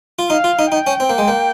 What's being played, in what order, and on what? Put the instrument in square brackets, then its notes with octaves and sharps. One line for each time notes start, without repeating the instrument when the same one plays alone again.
[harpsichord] F4
[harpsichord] D#4 [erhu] F5
[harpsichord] F4
D#4
[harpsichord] D#4 [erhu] G5
[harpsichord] C#4
C4
A#3
G#3
A#3